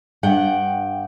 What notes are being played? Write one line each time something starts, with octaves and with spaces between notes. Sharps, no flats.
G2 F#5 G5